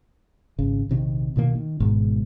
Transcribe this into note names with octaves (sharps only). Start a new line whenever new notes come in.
G#1 C#3
A#1 C3 D#3
C2 B2 D#3 A#3
D#3
G#1 G#2 B2